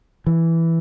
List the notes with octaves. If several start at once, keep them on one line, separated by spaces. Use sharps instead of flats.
E3